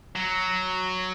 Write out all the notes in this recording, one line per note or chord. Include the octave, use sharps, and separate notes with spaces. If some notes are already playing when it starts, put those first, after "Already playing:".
F#3